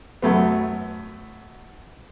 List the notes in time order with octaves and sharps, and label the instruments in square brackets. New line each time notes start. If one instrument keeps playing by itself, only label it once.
[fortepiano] F#2 A3 B3